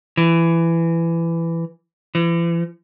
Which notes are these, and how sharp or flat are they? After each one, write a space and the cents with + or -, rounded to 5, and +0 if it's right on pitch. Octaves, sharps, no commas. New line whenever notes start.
E3 +15
E3 +40